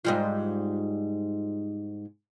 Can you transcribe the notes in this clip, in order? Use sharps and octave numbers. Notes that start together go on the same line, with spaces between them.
G#2 G3 F4